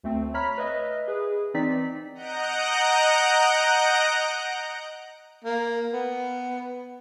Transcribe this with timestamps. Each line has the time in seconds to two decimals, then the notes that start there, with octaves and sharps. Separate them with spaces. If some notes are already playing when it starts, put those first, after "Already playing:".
0.04 D2 A3 C4
0.34 C#5 A#5 B5 F6 B6
0.58 B4 D#5 E5
1.08 G#4 B4
1.54 E3 C4 D#4 D5 B6
2.14 D#5 F#5 A#5 F#6 G6 D7
5.44 A#3
5.93 B3